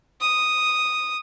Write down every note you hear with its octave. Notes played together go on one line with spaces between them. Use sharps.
D#6